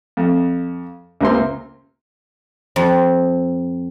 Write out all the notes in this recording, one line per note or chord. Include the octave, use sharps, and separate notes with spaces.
F2
C#2 C3 A#3 C4 C6
F2